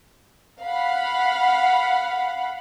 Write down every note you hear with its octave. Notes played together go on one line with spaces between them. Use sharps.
F5 F#5 B5